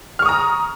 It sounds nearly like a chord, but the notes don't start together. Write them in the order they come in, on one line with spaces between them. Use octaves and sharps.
F6 C#6 D#6 A#5